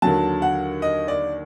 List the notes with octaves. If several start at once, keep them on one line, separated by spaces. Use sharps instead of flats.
D#2 D3 F#3 A5
F#5
D#5
D5